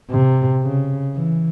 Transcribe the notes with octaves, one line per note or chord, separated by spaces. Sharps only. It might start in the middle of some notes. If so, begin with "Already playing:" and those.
C3
C#3
E3